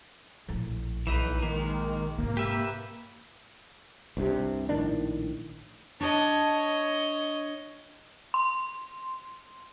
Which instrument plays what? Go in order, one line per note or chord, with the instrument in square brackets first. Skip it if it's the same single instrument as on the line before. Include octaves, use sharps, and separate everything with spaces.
[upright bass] A#1 A2
[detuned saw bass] B1 [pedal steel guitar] E3 D#4 B4
[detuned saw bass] D#3 [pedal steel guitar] G#3 A#3
[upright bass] G#2 C3 [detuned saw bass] A#3
[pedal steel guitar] G4 B4 E5
[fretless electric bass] C2 G2 C3
A#1 A2 D#3 D4
[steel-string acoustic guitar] D4 A5 [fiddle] C#5 D#5
[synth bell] C6